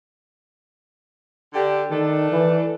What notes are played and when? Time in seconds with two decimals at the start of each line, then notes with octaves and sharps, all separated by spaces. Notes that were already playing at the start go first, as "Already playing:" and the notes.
1.53 D3 G4
1.91 D#3 A3 D4 A4
2.32 E3